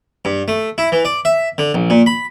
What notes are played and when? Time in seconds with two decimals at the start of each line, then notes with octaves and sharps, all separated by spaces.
0.25 G2
0.48 A3
0.78 E4
0.92 E3
1.05 D5
1.25 E5
1.58 D3
1.74 A#1
1.90 A#2
2.06 B5